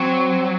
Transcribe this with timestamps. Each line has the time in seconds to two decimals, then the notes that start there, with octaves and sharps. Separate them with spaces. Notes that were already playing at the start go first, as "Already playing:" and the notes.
Already playing: F#3 C4